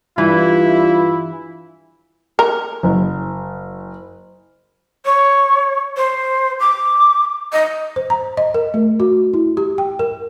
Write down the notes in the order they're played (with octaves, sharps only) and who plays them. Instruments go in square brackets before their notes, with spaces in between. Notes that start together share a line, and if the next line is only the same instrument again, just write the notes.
[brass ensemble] G2 F4 [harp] E3 [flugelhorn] E4
[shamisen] A#4
[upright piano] F#1
[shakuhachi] C#5
C5
D6
D#5
[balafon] C5
A#5
D#5
A#4
A3
F#4
E4
G4
G5
A#4